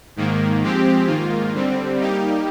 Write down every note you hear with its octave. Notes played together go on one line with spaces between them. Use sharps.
G#2 D#3 A#3
F3 G#3 C4 G4
G#2 D#3 A#3 F4
D3 G3 C4
G3 A#3 D#4 G4